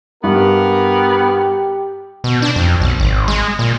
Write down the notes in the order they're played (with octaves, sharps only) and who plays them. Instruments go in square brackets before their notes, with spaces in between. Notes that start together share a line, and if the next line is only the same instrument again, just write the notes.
[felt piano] G2 [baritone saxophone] B3 [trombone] G4 [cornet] A#4
[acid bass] B2
D4
F2
B1
G#1
G#3
A#2